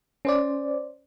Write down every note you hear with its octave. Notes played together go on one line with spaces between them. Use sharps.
C#4 C5 D5